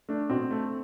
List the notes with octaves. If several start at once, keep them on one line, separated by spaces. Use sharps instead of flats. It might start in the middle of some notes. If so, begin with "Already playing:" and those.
A3 D4
B2 C4
A3